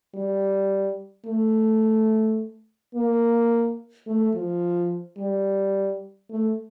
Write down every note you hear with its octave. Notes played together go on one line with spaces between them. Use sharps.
G3
A3
A#3
A3
F3
G3
A3